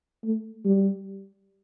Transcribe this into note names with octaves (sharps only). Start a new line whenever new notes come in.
A3
G3